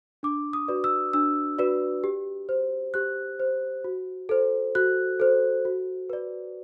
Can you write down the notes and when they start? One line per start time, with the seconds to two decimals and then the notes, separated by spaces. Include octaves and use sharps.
0.23 D4 D6
0.53 D#6
0.68 F#4 B4 D5
0.84 E6
1.13 D4 E6
1.59 F#4 B4 D5
2.04 G4
2.49 C5
2.94 G4 F#6
3.40 C5
3.84 F#4
4.29 A4 C5
4.75 F#4 F#6
5.20 A4 C5
5.65 F#4
6.10 B4 D5